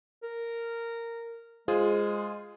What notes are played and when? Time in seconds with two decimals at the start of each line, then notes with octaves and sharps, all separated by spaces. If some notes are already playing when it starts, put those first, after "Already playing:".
0.23 A#4
1.68 G#3 F4 G#4 C5